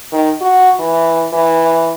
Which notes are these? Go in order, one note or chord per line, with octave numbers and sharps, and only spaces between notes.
D#3
F#4
E3
E3